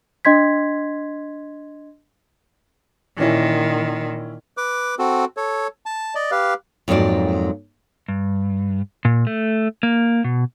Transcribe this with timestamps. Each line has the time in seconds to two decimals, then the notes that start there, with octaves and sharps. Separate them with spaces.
0.25 D4 D#5 C6 G#6 B6
3.18 A#2 D#3 E3 C#4 E4
4.57 B4 D6
4.99 C4 F#4 A4
5.37 A4 C#5
5.86 A5
6.15 D5 D#5
6.31 G4 B4 F5
6.88 F2 G#2 F#3 A#3 D5
8.08 G2
9.05 A#2
9.27 A3
9.83 A#3
10.24 B2